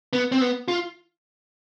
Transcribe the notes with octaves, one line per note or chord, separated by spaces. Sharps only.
B3
C4
B3
F4